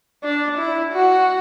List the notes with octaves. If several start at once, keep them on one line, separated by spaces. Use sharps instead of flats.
D4
E4
F#4